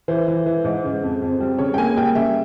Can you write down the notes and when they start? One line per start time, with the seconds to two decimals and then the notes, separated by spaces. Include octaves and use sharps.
0.08 E3 C5
0.28 E3
0.46 E3
0.64 G#2
0.84 C#3
1.03 F2
1.22 F2
1.40 G3
1.58 C#3 C#5
1.74 G5
1.78 A#3 G#5
1.96 G3 G5
2.15 C#3 E5